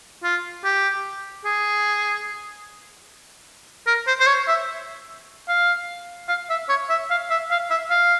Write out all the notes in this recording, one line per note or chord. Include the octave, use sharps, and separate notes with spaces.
F4
G4
G#4
A#4
C5
C5
C#5
E5
F5
F5
E5
C#5
E5
F5
E5
F5
E5
F5